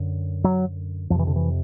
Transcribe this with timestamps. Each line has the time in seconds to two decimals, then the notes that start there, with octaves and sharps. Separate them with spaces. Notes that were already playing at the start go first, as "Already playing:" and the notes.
Already playing: F#2 D3
0.44 F#3
1.10 F2 C3 F3
1.19 E3
1.27 D3
1.36 E3